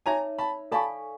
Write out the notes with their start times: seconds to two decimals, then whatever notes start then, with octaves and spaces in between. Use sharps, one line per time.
0.06 D#4 G#4 C#5 E5 G#5 A#5
0.38 A5 B5
0.72 A4 D5 F5 G#5 A5 B5 C#6